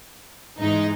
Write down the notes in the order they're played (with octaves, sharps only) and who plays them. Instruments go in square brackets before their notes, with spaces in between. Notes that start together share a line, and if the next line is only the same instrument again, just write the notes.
[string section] G#2 E3 G#3 D#4